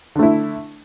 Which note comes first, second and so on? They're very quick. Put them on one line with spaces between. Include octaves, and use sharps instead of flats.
D3 A3 E4